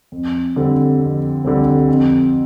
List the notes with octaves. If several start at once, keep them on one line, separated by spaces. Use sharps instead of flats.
F2
D3 G3 C4
F2
D3 G3 C4
F2